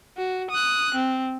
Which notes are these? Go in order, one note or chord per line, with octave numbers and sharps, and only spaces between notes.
F#4
D#6 F#6
C4